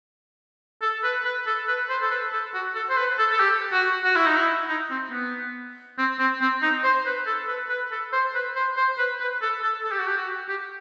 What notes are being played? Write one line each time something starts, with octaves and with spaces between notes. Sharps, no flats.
A4
B4
B4
A4
B4
C5
A4
B4
A4
F#4
A4
C5
B4
A4
A4
G4
F#4
F#4
E4
D#4
E4
D#4
C4
B3
C4
C4
C4
D#4
C5
B4
A4
B4
B4
A4
C5
B4
C5
C5
B4
B4
A4
A4
A4
G4
F#4
G4
F#4
G4